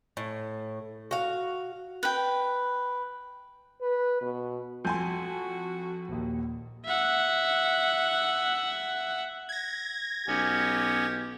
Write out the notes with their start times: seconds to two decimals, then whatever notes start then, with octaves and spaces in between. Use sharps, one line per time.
0.17 A2
1.11 F#4 F5
2.03 B4 G5
3.81 B4
4.21 B2
4.85 F2 F#4 G#5 C6 G6
6.08 A#1 D#2
6.85 E5 F#5
9.49 G#6 A#6
10.27 B1 B3 C#4 G4